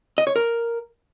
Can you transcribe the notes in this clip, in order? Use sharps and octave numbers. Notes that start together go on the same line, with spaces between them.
D#5
C#5
A#4